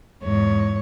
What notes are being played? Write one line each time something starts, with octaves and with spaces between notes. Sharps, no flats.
E2 G#2 C#5